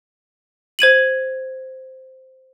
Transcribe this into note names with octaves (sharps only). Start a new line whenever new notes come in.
C5 G#6 D#7 F#7